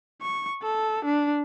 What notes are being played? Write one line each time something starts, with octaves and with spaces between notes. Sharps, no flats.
C#6
A4
D4